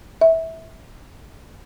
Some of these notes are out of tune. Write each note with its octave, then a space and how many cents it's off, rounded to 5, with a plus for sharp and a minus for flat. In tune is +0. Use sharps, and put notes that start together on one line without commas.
E5 -20